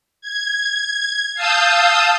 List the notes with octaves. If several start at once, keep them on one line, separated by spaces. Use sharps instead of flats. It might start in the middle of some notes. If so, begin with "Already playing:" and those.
G#6
F5 A5 D#6 E6 G6